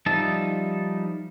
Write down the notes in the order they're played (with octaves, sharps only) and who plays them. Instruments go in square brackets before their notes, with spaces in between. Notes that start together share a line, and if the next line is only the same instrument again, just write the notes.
[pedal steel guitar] F3 G3 D#4 E5 A5